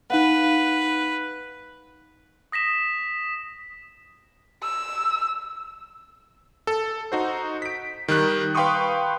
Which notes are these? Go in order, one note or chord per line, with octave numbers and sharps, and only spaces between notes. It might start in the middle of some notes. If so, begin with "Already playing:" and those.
D#4 B4 F5 F#5
D#6 A#6 B6 E7
E6
A4
D#4 F#4 C5
B6 D7
D#3 G3 F#6
B4 F5 G5 C6 C#6 D#6